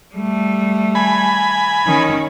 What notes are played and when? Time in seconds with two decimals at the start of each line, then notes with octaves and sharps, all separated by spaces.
0.15 G3 A3
0.95 G#5 B5
1.87 D#3 C#4